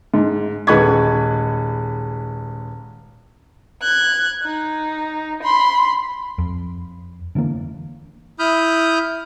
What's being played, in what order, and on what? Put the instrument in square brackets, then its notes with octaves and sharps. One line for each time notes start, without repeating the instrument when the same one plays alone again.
[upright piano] G#2
D#1 G#3 B4 B5 C#6 G#6
[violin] F#6 G#6
D#4
B5 C6
[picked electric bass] F2
D3 E3 G3 A#3
[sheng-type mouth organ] E4 B5 D#6 F6 G6